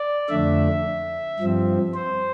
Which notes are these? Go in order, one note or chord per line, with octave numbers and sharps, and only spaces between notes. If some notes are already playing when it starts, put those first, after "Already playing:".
Already playing: D5
F2 D3 A3 D4 E5
G2 F3 C4
C5